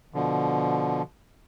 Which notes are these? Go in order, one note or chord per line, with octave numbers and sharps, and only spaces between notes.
B2 D3 F3